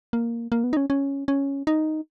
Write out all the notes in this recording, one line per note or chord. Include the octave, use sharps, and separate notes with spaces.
A#3
A#3
B3
D#4
C#4
C#4
C#4
D#4